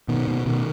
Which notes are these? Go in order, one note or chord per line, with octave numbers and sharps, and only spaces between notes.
B2 D#3
B2
B2 D#3